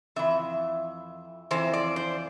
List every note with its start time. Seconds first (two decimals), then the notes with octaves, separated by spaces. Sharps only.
0.16 F2 E3 E5
1.51 F2 E3 C5
1.73 D5
1.96 C5